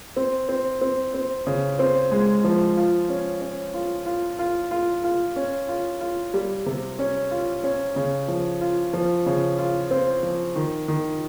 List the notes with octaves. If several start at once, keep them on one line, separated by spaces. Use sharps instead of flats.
C4
C4
C4
C4
C#3
C4
G#3
F3
F4
C#4
C#4
F4
F4
F4
F4
F4
C#4
F4
F4
G3
C3
C#4
F4
C#4
C#3
F3
F4
F3
C#3
F4
C4
F3
D#3
D#3